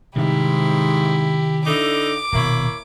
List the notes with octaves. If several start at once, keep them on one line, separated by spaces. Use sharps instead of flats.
G#2 C3 D#3 G3 E4 G4
D3 D#4 E4 D6
D#1 B2 A#3 E4 C#5